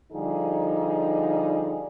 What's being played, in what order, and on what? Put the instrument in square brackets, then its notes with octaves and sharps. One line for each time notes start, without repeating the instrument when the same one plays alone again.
[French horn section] D3 F3 G3 D#4 G#4